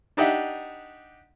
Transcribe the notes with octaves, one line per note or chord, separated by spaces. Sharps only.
D4 D#4 G4 E5 F#5